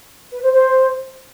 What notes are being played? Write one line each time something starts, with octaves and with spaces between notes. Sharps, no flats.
B4
C5
C5